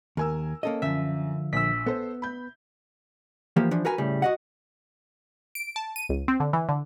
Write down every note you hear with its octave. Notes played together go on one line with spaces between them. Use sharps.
D#2 A#4 G#5 E6
A#3 C#4 A4 D#5
F#2 D3 F3 E5
A#1 E6 B6
B3 A4 C5
B5 G6
E3 F3 A#3 G4
E3 F3 D4
F#4 A#4 B4 G#5
A2 C#3 G3
F#4 D#5 F#5
D7
A5
D#7
C#2
C4
D3
E3
D3